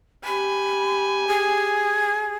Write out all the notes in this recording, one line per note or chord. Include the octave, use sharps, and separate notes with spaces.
G4 G#5 B5
G#4